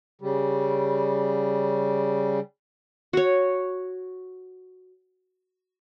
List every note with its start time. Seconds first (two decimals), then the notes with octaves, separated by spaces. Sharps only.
0.21 C#3 G3
3.13 F#4 C#5